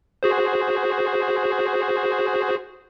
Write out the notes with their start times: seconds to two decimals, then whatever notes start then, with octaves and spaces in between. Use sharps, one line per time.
0.23 F#4 G#4 C5